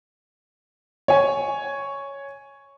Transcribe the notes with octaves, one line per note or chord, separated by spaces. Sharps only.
C#5 G#5